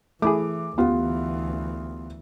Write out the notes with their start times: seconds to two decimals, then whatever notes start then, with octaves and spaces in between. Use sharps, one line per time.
0.22 E3 A3 E4 G#4 D6
0.78 D2 E3 B3 F4 G4